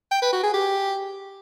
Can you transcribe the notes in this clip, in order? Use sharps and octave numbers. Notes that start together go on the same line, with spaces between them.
G5
B4
F#4
G#4
G4